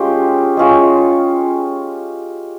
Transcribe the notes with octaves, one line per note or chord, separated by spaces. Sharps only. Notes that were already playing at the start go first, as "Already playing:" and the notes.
Already playing: G#3 C#4 F4 G4
G#3 C#4 F4